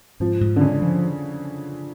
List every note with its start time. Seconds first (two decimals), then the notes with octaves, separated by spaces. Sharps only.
0.20 G#2 F3
0.41 G#2
0.56 D3
0.61 C#3 G#3
0.82 F3